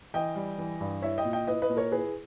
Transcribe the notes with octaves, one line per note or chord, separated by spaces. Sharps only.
E3 D#5 G5
G3
E3
G2
E4 C#5 E5
D#5 G5
A#2
D#5 G5
E4 B4 D#5
B4 D#5
A#2
A#4 C#5
E4 G#4 B4